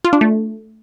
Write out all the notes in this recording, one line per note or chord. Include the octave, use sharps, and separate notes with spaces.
F4
D4
A3